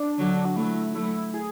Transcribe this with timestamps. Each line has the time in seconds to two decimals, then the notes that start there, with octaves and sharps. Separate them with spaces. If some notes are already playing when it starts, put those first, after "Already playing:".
Already playing: D4
0.18 D3 F#3
0.45 F#4
0.56 F#3 A3 E4
0.94 F#3 A3 E4
1.34 G#4